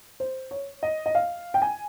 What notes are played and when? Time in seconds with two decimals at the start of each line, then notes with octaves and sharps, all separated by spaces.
0.20 C5
0.51 C#5
0.83 D#5
1.06 D#5
1.15 F5
1.54 G5
1.62 G#5